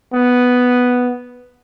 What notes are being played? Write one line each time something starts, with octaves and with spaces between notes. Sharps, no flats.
B3